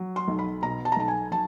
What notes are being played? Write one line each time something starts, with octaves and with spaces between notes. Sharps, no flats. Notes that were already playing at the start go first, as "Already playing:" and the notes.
Already playing: F#3
C6
B1
B5
B2 A#5
A5
A#5
B1 A5
G#5
F#3 A5